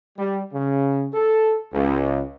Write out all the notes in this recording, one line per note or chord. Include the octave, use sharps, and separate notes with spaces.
G3
C#3
A4
C#2